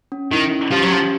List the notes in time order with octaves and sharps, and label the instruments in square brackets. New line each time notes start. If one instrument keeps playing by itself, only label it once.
[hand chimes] C#4
[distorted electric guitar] D#3 [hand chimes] E4
[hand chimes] C#4
[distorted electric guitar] F3 [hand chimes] G4
[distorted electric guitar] F#3
[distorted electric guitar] F3 [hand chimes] C#4